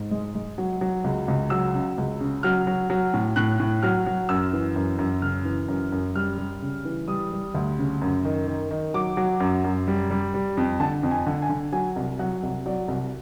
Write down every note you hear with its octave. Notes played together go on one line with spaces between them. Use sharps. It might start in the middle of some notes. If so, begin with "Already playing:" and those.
Already playing: G#2
G#3
G#3
F#3
F#3
C#2
C#2
F#3 E6
C#3
C#2
C#3
F#3 F6
F#3
F#3
A2
A2 F#6
A2
F#3 F6
F#3
F#2 E6
E3
F#2
F#2
C#3 F6
E3
F#2
F#2
G3 F6
G3
C#3
E3
G3 D#6
G3
D2
C#3
F#2
D#3
D#3
D#3
F#3 D6
F#3
F#2
F#2
G3
G3
G3
F2
D3 A5
F2
G#5
D3
G#5
D3
F#3 G#5
C2
F#3 F#5
C2
F#3 D5
C2